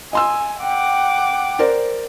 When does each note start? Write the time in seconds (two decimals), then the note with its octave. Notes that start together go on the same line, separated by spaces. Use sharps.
0.13 D#5 G#5 C6 E6
0.61 F#5 G5 D6
1.59 A#4 C5 D5